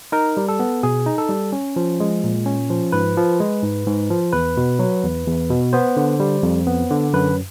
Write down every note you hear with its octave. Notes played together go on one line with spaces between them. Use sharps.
D#4 A#4
G3
A4
B3
B2 G#4
D#4
A4
G3
C#4
F3
G#3
A#2
C#4
F3
G#2 B4
F3
G#3
G#2
G#2
F3
E2 B4
B2
F#3
E2
E2
B2
B3 C5
D3
G3
F2
B3
D3
F#2 B4